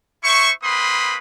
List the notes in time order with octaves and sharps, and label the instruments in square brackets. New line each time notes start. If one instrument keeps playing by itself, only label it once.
[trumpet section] E4 C5 E5 C#6
A#3 C4 B4 B5 C6 D#6